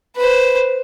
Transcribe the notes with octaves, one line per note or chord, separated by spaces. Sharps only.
B4 C5